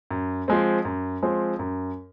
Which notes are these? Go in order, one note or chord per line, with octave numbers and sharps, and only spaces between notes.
F#2
F3 G#3 C4
F#2
F3 G#3 C4
F#2